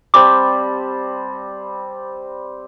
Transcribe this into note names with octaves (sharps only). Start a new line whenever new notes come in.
G3 C4 A5 D6